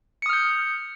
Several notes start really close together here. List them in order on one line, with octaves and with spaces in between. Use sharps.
C#7 D#6 F6 G6